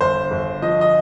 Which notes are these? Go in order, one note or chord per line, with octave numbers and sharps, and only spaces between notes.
G1 C5
G1
F3 D#5
D#5